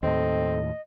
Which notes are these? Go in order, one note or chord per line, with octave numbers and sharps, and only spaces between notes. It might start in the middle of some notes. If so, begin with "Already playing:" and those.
D#2 A2 C4 A4 D#5